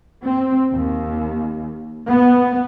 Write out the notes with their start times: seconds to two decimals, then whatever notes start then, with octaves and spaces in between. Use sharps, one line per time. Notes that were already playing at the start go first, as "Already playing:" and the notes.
0.23 C4
0.72 D#2
2.08 B3